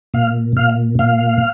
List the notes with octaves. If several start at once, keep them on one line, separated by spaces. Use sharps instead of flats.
A#2 F5
A#2 F5
A#2 F5